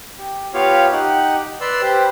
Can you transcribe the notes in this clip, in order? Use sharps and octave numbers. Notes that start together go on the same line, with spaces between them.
G4
B3 F4 G4 C#5 F5
D#4 G4 F#5
B4 D5 C6 E6
G4 B4 C5